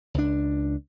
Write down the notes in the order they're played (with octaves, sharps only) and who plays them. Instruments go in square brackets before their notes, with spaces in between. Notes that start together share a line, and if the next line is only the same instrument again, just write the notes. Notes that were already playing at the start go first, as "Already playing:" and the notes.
[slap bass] C#2 D4